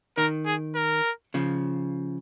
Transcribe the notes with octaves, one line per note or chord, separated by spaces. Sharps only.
D#3 A#4
G#4
A#4
C#3 F3